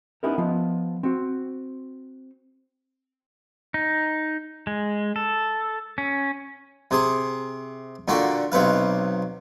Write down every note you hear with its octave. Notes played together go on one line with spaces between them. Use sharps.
B3 C#4 D#4 E4 G4 A#4
F3 B3 F4 D#5
C4 F#4
D#4
G#3
A4
C#4
C3 G#4 C6
A#2 D3 F#4 G5
B1 C3 B4 F5